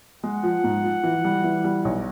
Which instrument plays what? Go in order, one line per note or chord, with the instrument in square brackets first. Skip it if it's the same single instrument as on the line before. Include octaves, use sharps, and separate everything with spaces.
[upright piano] G#3 [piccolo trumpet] F#5
[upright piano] F3
G#2
F3
E3
G3
E3
G3
B1